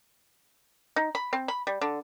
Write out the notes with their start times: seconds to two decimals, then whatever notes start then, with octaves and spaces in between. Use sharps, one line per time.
0.96 D#4
1.15 B5
1.33 C4
1.48 B5
1.67 G3
1.81 D3